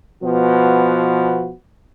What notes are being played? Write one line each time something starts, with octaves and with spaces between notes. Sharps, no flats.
B2 F3 B3 F#4